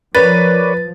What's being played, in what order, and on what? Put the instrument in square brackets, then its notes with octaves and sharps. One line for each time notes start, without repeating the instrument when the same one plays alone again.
[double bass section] F3 [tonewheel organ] A#4 C#5 D5 [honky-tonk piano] B4 [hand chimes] A6